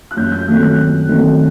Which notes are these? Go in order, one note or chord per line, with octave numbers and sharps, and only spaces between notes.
F#6
F#2 G6
G6
D#3 F#3 A3 C4 F#6
F#6
F#2
D#3 F#3 A3 C4